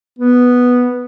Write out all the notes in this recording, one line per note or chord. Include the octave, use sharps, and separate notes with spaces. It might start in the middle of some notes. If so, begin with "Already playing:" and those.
B3